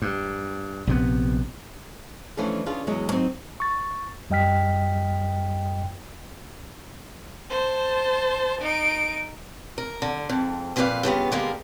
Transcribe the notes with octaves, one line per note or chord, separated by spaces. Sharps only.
G2
A#1 C3 B3
E3 F3 A3 C#4 D4 F4
C#4 D4 F4 G#4
E2 F#3 G#3 C#5 D#5
F#3 C4 D#4
C#6 A6
F#2 G3 D#5 G5 F6 B6
C5 A5
D#4 D7
A#4
D3
F2 G#2
F2 A#2 C#4 G4 B4 F5
G2 C#3 B3 F4
D3 G3 G#3 A#3 A#4